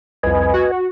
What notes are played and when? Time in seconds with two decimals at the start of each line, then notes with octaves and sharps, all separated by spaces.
0.23 C2 F2 B4 D#5 G#5
0.54 F#4